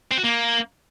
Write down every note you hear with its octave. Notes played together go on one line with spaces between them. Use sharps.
C4
F#4
A#3